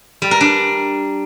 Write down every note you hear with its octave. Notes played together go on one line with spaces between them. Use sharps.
G3
A#4
D4